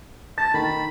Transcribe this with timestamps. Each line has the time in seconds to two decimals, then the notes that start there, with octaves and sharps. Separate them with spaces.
0.38 A5 A6
0.54 D#3 B5